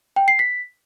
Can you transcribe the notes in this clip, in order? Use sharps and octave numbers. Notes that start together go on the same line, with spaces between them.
G5
C7
B6